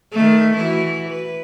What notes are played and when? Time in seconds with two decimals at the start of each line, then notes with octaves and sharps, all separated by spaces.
0.13 D#3 A3
0.55 E3 E4 F#4
1.10 B4